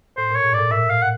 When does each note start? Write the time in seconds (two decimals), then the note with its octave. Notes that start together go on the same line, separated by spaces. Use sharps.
0.17 A2 C5
0.31 A#2 C#5
0.44 G#2
0.53 A#2 D5
0.59 A2
0.72 A#2 E5
0.90 F5
1.02 F#5